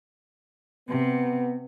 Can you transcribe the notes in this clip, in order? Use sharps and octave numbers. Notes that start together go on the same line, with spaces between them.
C3 B3